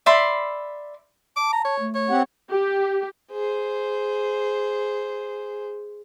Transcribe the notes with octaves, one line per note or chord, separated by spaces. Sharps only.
D5 E5 B5 C6
A5 D6
A#5
C#5
A3
C#5
C4 G4 F#5
G4
G#4 C5